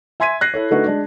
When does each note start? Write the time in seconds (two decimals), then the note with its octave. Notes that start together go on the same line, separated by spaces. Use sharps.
0.20 E5 G#5 C6 G#6 B6 D#7
0.41 F#6 A#6 C7
0.54 E4 A4 C#5
0.71 D3 A3 D#4 F#4 B4
0.86 G#3 D4